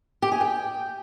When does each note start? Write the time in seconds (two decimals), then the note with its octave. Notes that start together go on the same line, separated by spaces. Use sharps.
0.22 G4
0.32 G#4
0.41 G5